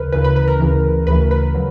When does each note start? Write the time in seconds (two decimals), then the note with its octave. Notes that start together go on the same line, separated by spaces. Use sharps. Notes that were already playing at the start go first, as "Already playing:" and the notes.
Already playing: D2 C#3 A#4 B4
0.12 D2 C#3 E3 B4
0.24 B4
0.36 B4
0.48 A#4
0.60 D2 C#3 E3
1.07 D2 C#3 E3 B4
1.31 B4
1.54 C#3 F#3